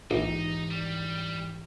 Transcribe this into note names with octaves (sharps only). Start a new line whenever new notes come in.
A#1 G#2 E3 D#4 G4
G3